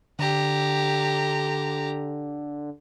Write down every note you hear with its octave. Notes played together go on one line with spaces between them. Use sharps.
D3 G4 A#5